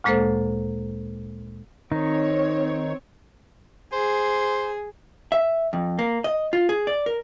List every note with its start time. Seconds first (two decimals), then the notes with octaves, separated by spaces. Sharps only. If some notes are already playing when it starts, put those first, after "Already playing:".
0.04 D2 A#2 G#3 A#3 A4 C5
1.92 D#3 C4 D#4 C#5
3.93 G#4 C5
5.32 E5
5.73 F2
5.99 A#3
6.24 D#5
6.53 F4
6.69 G#4
6.87 D5
7.06 A#4